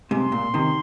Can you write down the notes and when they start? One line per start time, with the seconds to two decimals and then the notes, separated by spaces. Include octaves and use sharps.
0.10 G#2 C3 C6
0.32 A#2
0.54 C3 D#3